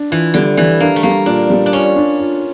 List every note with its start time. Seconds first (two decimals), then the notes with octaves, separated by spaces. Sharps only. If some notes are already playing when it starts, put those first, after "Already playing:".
Already playing: D4
0.11 E3 F4
0.34 D3 G3
0.57 E3 G3
0.80 A#3 D4
0.96 A3
1.03 G3 A#3
1.26 A#2 D4
1.50 G3
1.66 D4
1.73 C#4 F4
1.96 D4
2.19 F4